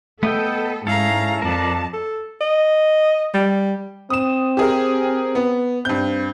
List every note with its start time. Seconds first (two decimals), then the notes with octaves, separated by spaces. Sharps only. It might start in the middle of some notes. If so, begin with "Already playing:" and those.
0.23 A3 B3 A4 D#5 G5
0.87 G#2 C#4 E4 A4 F5 A#5
1.42 F2 A#4 D5 A5
1.94 A4
2.41 D#5
3.34 G3
4.10 C4 D#6 E7
4.57 G4 G#4 A#4
5.35 B3
5.85 G2 C4 G6